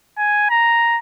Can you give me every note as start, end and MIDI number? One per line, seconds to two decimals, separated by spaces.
0.18 0.47 80
0.50 0.99 82